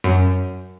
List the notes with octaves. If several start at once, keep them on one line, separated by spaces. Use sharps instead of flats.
F#2